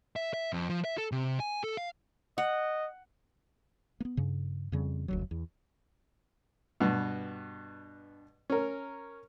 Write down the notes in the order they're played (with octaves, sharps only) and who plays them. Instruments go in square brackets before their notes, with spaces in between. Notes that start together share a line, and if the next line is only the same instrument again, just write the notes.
[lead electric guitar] E5
E5
F2
F3
E5
A4
C3
G#5
A4
F5
[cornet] D#5 [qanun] F#5
[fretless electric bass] A#3 B3
G2 C#3
F2 C#3 G3
F1 D2 F#3
E2
[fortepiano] G2 B2
C#4 A#4